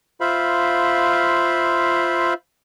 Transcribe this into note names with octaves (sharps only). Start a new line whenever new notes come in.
F4 C5 E5 F5 B5